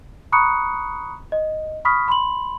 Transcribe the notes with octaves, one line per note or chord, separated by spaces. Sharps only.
A#5 B5 C#6 D#6 F#6 C#7
D#5
B5 C#6 D#6 F6 B6
B5 C6 F#7